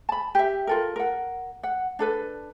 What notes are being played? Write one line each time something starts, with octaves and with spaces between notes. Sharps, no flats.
A5 B5
G4 E5
F4 A4 A#4
A#4 F#5
F#5
D4 A4 B4